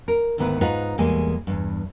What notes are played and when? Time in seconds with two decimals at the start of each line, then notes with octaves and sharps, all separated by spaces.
0.08 A#4
0.38 D2 G#2 D#3 B3 E4 B4
0.61 G#2 D#4 F4 B4 F#5
0.98 E2 A2 G3 G#3 A#3 G#5
1.47 E2 G2